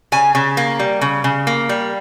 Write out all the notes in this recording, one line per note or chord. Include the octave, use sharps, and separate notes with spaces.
C#3 G#5
C#3
A#3
G3
C#3
C#3
A#3
G3